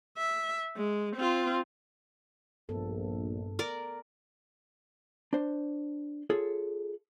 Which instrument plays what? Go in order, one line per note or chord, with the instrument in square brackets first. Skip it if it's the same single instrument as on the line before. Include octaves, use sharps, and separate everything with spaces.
[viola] E5
G#3
C4 F4
[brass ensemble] A#1 [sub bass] G2 [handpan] B3 A4
[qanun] A#4 D5
[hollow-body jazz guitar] D4 C5
F4 G#4 A4 C#5